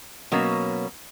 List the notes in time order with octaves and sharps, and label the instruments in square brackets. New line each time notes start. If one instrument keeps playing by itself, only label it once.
[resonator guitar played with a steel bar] B2 F#3 A#3 C#4